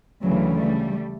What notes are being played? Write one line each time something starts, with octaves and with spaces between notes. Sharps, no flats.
D2 C#3 E3 F#3
G3 A3